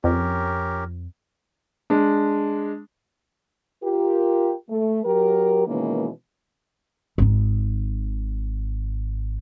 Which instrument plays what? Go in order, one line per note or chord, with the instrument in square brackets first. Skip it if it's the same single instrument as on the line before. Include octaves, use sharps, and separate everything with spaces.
[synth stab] F2 [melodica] C#4 G4 A#4
[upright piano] G#3 D4
[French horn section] F4 G4 A#4
A3
F#3 G4 A#4
B2 D#3 E3 G#3 A#3 C#4
[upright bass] G#1 D#4